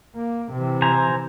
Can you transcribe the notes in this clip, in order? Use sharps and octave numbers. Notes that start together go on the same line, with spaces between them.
A#3
C3 E3
C5 G#5 A#5